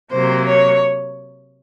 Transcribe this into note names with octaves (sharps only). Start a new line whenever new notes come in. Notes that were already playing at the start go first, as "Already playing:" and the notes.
C3 F#3 A#3 C5
C#5